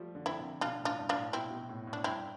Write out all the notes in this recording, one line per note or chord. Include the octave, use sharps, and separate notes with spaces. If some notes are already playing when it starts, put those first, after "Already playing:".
Already playing: F3 G3 A3
D3
D3 C4 E4
C3
B2 D4 F4
A2
D4 F4
G2
D4 F4
A2
B2 C4 E4
B2
A2
A2
D4
G2 C4 E4